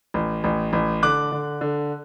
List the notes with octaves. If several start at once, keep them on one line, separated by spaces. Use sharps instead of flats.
A1
A1
A1
D3 D6 F#6
D3
D3